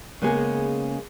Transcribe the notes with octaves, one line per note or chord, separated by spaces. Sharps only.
C#3 G#3 A#3 B3 G#4